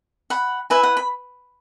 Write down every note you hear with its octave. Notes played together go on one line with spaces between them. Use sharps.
F#5 B5
E4 B4 E5 G#5
F#5
B5